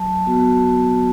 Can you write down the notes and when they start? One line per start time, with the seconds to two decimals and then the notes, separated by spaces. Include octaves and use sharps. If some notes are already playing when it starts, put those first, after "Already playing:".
Already playing: F#3 A5
0.26 B3 F#4